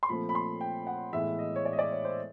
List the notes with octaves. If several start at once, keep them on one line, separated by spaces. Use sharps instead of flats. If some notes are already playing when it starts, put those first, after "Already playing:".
C6
A#2 F3 A3 C4 B5
B5
C6
G5
F#5
A2 E3 G#3 B3 E5
D#5
C#5
D5
D#5
D5
C#5
C5